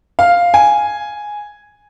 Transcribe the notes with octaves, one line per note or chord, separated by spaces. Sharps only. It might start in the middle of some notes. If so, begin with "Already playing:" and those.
F5
G#5